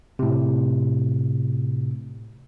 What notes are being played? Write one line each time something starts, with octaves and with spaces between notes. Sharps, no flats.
A2 C3